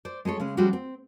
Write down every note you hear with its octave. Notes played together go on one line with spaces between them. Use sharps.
C5 D5
G#3 G#4 A4 C#5
C#3 G#3 C#4
F3 G3 G#3 C#4 F#4 G4
C4